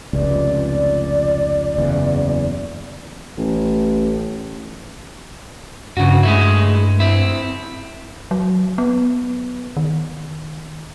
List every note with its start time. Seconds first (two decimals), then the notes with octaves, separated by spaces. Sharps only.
0.13 F1 C#2 D5
1.78 F#1 E2 C#3
3.38 A1
5.97 G2 C#3 F#4
6.23 G#3 A3 E4
7.00 C4 E4
8.31 F#3
8.78 B3
9.77 D#3